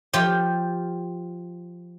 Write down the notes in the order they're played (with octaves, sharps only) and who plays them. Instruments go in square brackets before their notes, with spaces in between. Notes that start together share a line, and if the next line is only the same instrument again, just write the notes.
[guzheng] F3 F4 G4